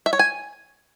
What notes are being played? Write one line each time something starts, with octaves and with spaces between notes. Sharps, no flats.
E5
C#5
G#5